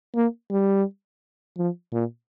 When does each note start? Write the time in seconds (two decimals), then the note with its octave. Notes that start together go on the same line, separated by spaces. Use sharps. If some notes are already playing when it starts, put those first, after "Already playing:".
0.15 A#3
0.51 G3
1.57 F3
1.93 A#2